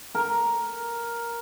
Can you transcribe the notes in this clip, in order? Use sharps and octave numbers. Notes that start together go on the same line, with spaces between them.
A#4